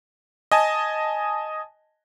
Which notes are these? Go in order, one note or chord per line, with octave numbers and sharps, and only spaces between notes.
D#5 G#5 A5